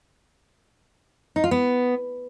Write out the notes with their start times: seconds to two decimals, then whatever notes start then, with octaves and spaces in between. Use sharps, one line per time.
1.36 D#4
1.44 F4
1.51 B3